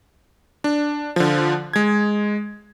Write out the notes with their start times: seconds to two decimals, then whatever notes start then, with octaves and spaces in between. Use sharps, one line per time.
0.64 D4
1.16 D3 F3
1.73 G#3 G#6